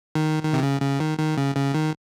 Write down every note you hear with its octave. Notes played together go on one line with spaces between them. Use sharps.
D#3
D#3
C3
C#3
C#3
D#3
D#3
C#3
C#3
D#3